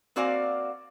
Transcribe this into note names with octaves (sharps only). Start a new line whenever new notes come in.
A#3 C4 F#4 D5 F5 G#5